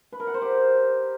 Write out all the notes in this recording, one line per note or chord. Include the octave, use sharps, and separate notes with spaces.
B4
A#4
F#5
C5
G4